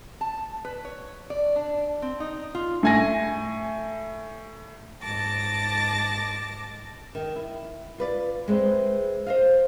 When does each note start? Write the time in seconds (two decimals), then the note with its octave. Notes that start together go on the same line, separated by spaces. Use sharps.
0.21 A5
0.65 B4
0.85 C#5
1.30 D5
1.56 D4
2.02 C4
2.20 D#4
2.55 F4
2.83 A2 G#5 A#6
5.02 G#2 A5 D6 A#6
7.15 D#3
7.36 E4
7.98 F4 B4 D5
8.48 G#3 A3 C4 B4
9.27 C5 D#5 F5